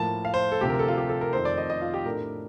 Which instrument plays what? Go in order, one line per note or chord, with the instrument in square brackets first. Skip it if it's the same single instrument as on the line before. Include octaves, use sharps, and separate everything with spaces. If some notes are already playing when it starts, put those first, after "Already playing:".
Already playing: [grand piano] A2 F3 A#3 A5
F5
C5
A4
D2 C3 F3 G4
A#4
A4
F4
G4
A4
A#4
F2 D#3 A3 C4 C5
D5
D#5
D#5
F4
G4
A2 A3 D4 A#4